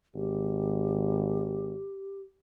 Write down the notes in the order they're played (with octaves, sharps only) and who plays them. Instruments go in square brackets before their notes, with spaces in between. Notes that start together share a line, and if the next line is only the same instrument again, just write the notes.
[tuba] G#1 [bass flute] G4